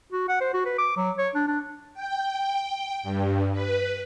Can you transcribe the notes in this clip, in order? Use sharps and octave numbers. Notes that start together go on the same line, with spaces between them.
F#4
F#5
C5
F#4
B4
D6
F#3
C#5
D4
D4
G5
G2
B4